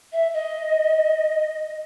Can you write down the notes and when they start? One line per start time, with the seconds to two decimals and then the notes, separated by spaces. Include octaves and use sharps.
0.12 E5
0.34 D#5